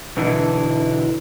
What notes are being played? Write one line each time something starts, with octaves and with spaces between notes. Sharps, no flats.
B2 D3 E3 E4